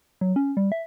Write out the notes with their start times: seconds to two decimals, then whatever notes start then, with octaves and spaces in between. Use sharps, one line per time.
0.21 F#3
0.36 C#4
0.57 G3
0.72 E5